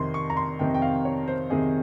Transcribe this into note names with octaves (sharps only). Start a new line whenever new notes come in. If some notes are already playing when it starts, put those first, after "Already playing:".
Already playing: F2 C3 D#3 C6
C#6
A#5
C6
F2 C3 D#3 G5
G5
F5
C#5
C5
F2 C3 D#3 G#4